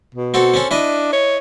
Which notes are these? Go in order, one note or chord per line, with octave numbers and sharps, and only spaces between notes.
B2
C4 F#4 A4
C4 C#4 A4
D4 E4 B4 D#5
C#5